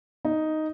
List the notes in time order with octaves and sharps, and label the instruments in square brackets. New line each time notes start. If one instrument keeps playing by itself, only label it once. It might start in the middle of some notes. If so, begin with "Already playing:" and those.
[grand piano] D#4